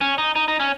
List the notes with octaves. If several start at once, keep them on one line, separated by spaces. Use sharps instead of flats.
C#4
D#4
D#4
D#4
C#4